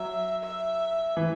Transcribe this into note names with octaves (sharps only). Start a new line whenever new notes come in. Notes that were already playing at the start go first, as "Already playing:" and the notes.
Already playing: F#3 E5
E5
E3